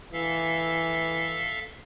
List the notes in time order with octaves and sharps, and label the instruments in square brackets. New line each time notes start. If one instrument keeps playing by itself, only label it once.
[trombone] E3 [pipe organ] A4 E5 F5